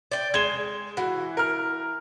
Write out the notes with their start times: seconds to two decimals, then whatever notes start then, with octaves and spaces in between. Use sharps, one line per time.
0.12 D5 G5
0.34 G#3 G#6 E7 G7
0.97 E3 F#4
1.37 A#4 F6